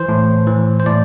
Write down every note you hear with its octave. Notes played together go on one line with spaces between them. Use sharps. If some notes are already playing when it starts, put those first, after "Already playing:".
Already playing: E3 C5
A2
E3
C5
A2 D5